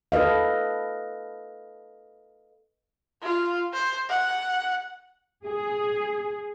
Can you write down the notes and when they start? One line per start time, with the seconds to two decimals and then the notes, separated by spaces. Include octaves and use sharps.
0.12 A4 B4 D#5 F5
3.22 F4
3.74 C5
4.09 F#5
5.46 G#4